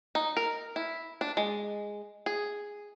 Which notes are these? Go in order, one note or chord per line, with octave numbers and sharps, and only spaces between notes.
D#4
A#4
E4
D4
G#3
G#4